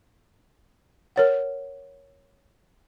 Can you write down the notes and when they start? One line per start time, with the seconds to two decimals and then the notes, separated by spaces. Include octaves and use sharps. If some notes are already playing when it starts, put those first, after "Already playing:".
1.16 A#4 C#5 F#5